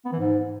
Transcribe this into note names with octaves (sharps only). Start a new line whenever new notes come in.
B3
E3
G#2